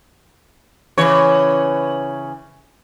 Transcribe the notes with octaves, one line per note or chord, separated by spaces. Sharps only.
C#3 E3 C#5